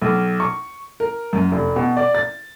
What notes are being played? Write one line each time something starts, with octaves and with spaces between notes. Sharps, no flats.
B1
C#6
A#4
F#2
F1
B2
D5
A6